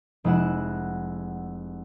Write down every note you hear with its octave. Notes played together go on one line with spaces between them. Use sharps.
F1 G#3 E4 F#5 E7